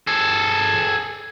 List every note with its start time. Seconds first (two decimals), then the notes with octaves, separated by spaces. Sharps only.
0.07 G#4 A4